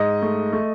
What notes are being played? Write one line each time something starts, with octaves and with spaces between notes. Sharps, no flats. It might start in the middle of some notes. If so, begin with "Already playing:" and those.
Already playing: G#2 D#5
A3
A3